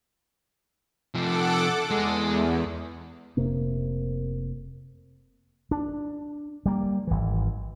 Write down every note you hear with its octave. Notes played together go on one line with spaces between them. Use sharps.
C3 F3 A4 F#5 D6
E2 G#3
F1 C3 A#3
D4
G3 A#3
G#1 E3